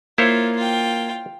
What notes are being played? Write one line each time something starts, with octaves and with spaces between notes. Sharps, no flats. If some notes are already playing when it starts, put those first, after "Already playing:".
A#3 E4 F4 C5 C#5
F4 G5